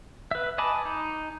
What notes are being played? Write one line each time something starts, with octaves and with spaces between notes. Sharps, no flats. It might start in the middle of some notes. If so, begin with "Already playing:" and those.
B4 E5
D#5 G#5 A5 B5 D6
D#4